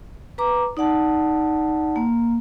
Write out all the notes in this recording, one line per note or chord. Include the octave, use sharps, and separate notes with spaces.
B4 A#5 D6
D#4 D5 F#5 A5
A#3